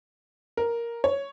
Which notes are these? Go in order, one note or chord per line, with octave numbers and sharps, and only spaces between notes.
A#4
C#5